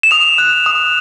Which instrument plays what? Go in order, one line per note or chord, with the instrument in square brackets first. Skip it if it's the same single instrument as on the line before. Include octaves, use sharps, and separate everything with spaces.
[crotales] E7
D#6 F7
F#6
D#6